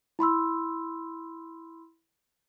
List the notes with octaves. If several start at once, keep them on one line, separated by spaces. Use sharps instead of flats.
E4 B5 C6 E6